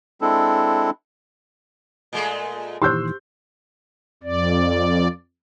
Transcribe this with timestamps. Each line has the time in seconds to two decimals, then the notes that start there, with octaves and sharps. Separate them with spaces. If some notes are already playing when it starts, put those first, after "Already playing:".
0.21 G#3 C4 D4 E4 A4
2.13 A#2 G#3 A3
2.82 A#2 D#3 E3 G4 C5 C6 E6 G6
4.23 F2 D5